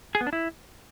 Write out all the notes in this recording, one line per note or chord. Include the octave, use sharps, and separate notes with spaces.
G#4
B3
D4
E4